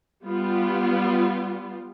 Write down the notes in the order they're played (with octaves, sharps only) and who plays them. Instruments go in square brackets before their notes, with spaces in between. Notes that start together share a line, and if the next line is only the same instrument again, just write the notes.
[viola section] G3 B3 F4